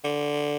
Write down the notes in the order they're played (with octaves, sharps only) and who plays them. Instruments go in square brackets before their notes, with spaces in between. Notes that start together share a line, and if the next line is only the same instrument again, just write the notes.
[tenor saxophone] D3